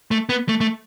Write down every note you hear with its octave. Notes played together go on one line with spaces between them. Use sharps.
A3
B3
A3
A3